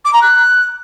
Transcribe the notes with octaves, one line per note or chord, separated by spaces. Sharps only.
D6
A#5
F#6